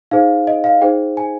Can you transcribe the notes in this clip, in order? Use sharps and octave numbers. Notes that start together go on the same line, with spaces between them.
D#4 G#4 C5 F5
D#5
F5
D#4 G#4 C5 G5
G#5